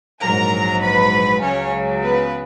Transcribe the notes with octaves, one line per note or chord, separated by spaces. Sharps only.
A#1 G#2 F#3 A#4 A#5
B4 B5
C#2 C#3 F#3 C#4 C#5
B3 B4